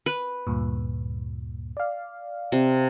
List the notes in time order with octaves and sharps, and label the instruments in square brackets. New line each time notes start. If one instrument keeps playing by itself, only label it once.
[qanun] B4
[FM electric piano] D2 G2 A#2
D5 F5
[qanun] C3